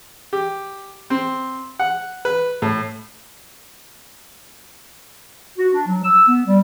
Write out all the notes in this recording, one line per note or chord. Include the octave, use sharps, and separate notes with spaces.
G4
C4
F#5
B4
A2
F#4
D4
F#3
E6
B3
G3